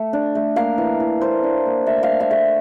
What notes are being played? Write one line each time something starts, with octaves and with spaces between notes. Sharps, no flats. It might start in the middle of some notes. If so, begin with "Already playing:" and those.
Already playing: A3
D4
A3
A#3 F5
E3
E3
A#3 C5
D4
A#3
A3 E5
F5
A3
E5
A3